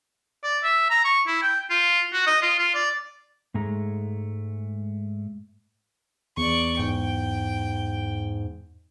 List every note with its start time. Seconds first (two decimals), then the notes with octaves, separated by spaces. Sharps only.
0.44 D5
0.63 E5
0.90 A#5
1.04 C#6
1.27 E4
1.42 G5
1.70 F4
2.13 F#4
2.26 D#5
2.42 F4
2.58 F4
2.74 D5
3.54 G#2 G#3 A3 A#5
6.37 E2 D5 C#6
6.79 G#2 G5